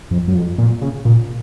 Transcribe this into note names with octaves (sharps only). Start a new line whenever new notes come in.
F2
F#2
F2
A#2
C#3
A#2